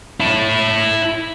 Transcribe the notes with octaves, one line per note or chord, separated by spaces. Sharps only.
E4 A5